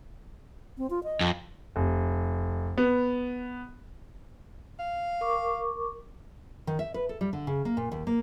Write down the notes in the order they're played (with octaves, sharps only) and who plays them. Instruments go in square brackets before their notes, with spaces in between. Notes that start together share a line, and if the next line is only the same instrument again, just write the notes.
[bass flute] C4
F4
D#5
[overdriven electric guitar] F2
[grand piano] F1
B3
[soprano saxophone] F5
[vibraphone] A#4 C#6 D6
[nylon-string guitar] D#3
E5
B4
A4
G3
D3
C#3
A#3
A#2
D#2
A#3